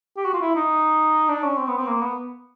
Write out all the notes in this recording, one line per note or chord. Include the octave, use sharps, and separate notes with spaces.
G4
F#4
F4
E4
D#4
D4
C#4
C4
B3
C4
A#3
B3